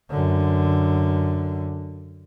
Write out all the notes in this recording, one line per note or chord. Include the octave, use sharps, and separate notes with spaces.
F#2 D3